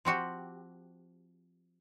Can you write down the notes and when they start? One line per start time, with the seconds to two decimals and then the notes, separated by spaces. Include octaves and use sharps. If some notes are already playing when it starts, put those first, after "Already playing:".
0.05 F3 C4 F#4 G4